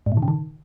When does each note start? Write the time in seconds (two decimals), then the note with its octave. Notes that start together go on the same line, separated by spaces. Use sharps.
0.06 G#2
0.12 A#2
0.17 D#3
0.22 C#3
0.28 D#3